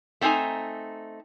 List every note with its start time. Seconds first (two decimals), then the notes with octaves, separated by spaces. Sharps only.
0.21 A3 C4 D4 D#4 G#5 A#5